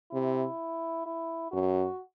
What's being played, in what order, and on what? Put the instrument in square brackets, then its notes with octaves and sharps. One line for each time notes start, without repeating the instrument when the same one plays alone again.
[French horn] C3 [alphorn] E4
[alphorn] E4
[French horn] F#2 [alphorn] F#4